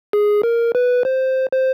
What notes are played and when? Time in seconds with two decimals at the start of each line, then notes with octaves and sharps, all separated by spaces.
0.13 G#4
0.43 A#4
0.75 B4
1.05 C5
1.52 C5